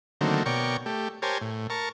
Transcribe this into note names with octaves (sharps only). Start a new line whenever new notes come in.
D3 D#3 F#3 A3 A#3 C4
B2 A#4 C#5 D5 G5 C#6
A3 G4
G4 A#4 C5 C#5 G#5 A5
A2
A#4 A5 C#6